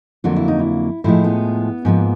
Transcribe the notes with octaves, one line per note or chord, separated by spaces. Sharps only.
F2 D3 F#3 A#3 F4
E4
D#4
E4
A2 F3 G#3 E4
B3
G#2 F3 A#3